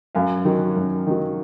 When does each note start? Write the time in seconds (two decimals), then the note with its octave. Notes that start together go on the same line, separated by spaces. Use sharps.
0.15 F#2 F5 G#5
0.45 D#3 F#3
0.76 F#2
1.07 D#3 F#3